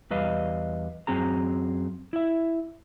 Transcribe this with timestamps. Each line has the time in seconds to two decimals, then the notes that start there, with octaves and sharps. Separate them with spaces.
0.10 E2 G3 B4 D#5 F5
1.07 F#2 F#3 C4 G#4 A#5
2.13 E4 E5